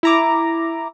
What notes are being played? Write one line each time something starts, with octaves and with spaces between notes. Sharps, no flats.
E4 A#5 D6